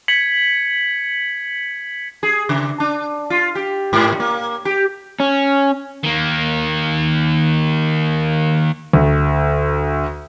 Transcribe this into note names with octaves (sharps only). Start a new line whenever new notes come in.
G#6 B6 C#7 F#7
G#4
C#3
D4
F4
G4
G#2
A#3
G4
C#4
D#3 A#3
D2